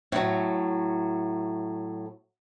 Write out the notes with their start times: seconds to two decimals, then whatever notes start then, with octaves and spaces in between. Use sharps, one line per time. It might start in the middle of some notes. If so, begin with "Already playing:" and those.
0.12 A2 F#3